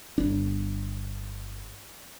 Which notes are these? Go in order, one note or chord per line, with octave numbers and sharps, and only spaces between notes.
G1 D4